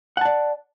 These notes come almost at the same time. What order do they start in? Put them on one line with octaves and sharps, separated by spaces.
F#5 A5 D5